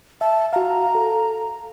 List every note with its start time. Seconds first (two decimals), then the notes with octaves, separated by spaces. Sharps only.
0.21 E5 A5
0.53 F#4 F5 A#5
0.95 A4